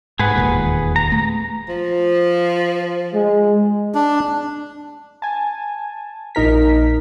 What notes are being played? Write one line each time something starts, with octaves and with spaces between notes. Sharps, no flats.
G#2 G#4 B4 F#5
E1 D#2 A#2
A#5
A3
F3
G#3
D4
G#5 A5
A#1 D#4 A#4 B6